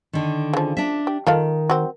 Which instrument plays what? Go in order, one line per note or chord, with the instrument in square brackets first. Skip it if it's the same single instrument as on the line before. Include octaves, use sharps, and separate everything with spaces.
[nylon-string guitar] D3 D#3
[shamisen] C#3 F3
[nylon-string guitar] D4 E5
[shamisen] G4
[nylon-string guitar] D#3 [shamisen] F4 A4 F5
[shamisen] C4 F#4